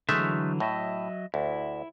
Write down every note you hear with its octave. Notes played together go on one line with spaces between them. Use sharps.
D3 E3 F#3 G#3 A3 E5
A2 F#3 D#5 E5
D2 E4